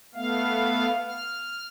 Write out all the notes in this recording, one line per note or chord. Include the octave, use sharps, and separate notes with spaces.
A3 B3 F5
F6